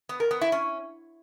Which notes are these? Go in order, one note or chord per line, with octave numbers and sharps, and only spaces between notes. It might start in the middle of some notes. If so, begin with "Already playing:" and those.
B3
A#4
B3
E4
C#4